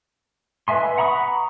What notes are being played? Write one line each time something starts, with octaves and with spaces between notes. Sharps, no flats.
B4 D#5 E5 G#5 C6
F#5 A#5 B5 C#6 D#6